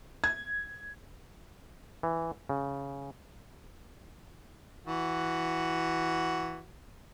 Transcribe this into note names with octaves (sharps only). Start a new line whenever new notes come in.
G#6
E3
C#3
E3 F#4